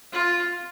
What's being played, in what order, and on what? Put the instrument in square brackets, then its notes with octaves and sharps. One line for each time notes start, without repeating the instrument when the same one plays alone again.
[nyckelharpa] F4